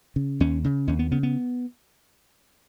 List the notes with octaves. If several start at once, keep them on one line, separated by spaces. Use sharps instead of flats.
C#3
D#2 C#4
C#3
D#2 C#4
B3
C#3 B3
B3